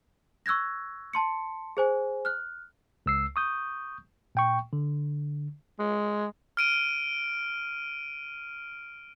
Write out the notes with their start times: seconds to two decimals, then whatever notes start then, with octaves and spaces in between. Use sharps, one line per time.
0.46 C#6 E6 F#6 G#6 A#6
1.13 A5 C6 C#7
1.77 G#4 C5 G#5
2.25 F6 F#6
3.06 C#2 E6 C7
3.36 C#6 D#6 G6
4.35 A#2 G5 C#6
4.73 D3
5.79 G#3
6.57 F6 D7 D#7